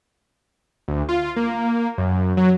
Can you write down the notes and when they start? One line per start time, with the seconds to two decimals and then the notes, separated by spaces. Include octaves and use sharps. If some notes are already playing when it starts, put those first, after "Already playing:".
0.88 D2
1.08 F4
1.36 A#3
1.98 F#2
2.37 F#3